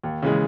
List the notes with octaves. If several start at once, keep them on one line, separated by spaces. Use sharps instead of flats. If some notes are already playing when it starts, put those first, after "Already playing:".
D#2
C#3 E3 G#3